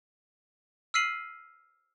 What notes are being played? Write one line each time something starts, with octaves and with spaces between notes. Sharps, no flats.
E6 F6 B6 C7 D#7 F#7